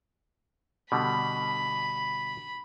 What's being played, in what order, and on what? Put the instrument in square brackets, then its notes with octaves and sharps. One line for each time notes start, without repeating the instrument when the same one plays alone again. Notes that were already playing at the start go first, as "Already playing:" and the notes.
[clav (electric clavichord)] B2 D3 G3 [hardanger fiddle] B5